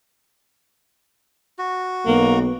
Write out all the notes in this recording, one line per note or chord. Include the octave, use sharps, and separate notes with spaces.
F#4
B1 A#3 B3